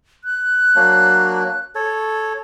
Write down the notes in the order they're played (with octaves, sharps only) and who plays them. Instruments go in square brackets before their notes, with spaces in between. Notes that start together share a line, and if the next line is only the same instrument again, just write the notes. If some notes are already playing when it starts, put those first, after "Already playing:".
[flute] F#6
[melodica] F#3 A#3 D4
A4 C#5